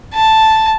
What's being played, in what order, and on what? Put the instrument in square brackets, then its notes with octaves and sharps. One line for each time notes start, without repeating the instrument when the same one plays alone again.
[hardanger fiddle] A5